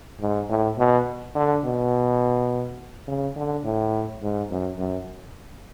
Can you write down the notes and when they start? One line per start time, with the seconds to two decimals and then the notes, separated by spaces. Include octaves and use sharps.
0.21 G#2
0.49 A2
0.78 B2
1.35 D3
1.65 B2
3.08 C#3
3.36 D3
3.64 A2
4.22 G#2
4.51 F#2
4.78 F#2